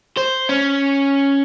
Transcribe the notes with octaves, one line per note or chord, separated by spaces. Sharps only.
C5
C#4